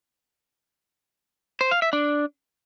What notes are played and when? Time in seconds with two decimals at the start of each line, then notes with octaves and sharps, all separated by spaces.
1.61 C5
1.71 F5
1.82 E5
1.93 D4